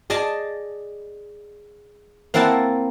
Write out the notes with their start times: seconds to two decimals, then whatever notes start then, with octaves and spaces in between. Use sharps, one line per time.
0.10 G#4 D5 D#5 A5
2.34 A#3 C4 E4 F#5 A5